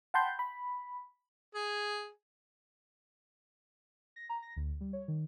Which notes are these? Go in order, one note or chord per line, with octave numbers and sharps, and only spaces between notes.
F#5 G5 A5 B5 C6 G6
B5
G#4
A#6
A#5
A#6
D2
G3
C#5
D#3